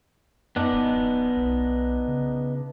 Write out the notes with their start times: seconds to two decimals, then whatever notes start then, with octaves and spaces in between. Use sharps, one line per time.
0.56 F#2 B3 D4 D#4
0.72 D1
1.36 B1
2.07 C#3